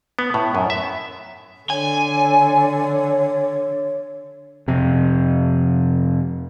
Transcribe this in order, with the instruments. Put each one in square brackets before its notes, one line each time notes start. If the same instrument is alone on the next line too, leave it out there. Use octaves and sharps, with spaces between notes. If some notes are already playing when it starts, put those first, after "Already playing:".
[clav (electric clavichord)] B3
A2
F#2
E5
[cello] D3 [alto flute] C#5 [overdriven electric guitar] G#5
[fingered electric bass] F2 C3